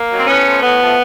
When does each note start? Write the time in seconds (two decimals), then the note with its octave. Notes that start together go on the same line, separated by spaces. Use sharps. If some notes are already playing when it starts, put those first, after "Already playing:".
Already playing: A#3
0.09 D#3 F#3
0.19 C4
0.26 A2 B3 C#4
0.45 F3 A3
0.62 A2 B3
0.80 F3 A3